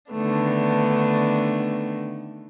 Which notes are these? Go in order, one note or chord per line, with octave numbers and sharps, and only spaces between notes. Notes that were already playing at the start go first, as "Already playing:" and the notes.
D3 D#3 A3 B3 D4